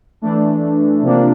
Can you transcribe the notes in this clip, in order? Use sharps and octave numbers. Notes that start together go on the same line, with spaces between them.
E3 A3 D4
C3 F3 A#3 D4